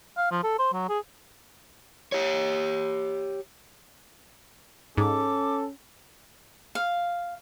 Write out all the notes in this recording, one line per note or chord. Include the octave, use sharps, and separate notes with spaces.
F5
F3
A4
C5
F#3
G#4
G4 C#5
G#2 C#4 A4 D6
F5